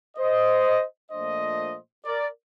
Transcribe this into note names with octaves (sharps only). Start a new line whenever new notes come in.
C5 D#5
A#2 F3 A3 D4 C5 D#5
A#4 D5